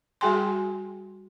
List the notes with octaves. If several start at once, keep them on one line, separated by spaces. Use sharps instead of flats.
G3 F#4 G#4 G5 G#5 C6